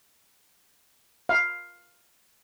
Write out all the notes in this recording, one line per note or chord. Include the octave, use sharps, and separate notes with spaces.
F5